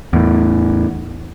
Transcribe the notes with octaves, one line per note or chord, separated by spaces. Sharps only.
E2 A2